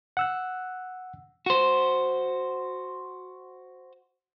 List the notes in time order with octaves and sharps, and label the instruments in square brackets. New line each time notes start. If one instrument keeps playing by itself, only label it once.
[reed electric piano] F#5 E6 F#6
[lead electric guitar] F#4 C5